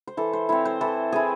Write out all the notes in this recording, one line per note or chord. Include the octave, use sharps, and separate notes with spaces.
C5
E3 A4
C5
C4 E4 C#5
C5
E3 A4
C4 E4 G#4